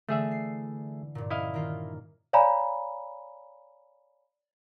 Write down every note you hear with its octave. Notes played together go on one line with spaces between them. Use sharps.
D3 E3 A3 G#4 E5
C7
G2 A#2
C#4 E4 D#5 F5
D#3 A#3 F4
C#5 D5 F5 G#5 A#5 B5